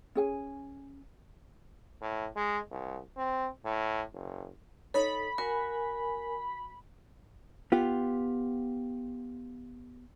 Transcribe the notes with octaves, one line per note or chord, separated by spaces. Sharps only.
C#4 G#4 G#5
A2
G#3
C2
C4
A2
F#1
D#4 A4 C#5 B5
F#4 A#4 G#5
B3 F4 G4